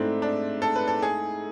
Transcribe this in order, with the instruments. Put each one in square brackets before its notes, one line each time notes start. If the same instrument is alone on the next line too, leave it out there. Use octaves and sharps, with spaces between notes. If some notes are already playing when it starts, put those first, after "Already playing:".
Already playing: [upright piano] G#2 A3 E4 [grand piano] C4 D4
[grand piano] D4
A4
B4
A4
G#4